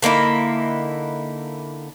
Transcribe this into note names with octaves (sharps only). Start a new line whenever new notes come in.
D3 A#3 D#4 E4